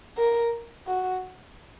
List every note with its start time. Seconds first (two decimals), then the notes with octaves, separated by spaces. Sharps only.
0.17 A#4
0.87 F#4